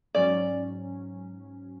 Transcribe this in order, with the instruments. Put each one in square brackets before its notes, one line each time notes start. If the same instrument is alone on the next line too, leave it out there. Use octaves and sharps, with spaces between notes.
[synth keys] G#2 F#3 C#4 [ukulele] D5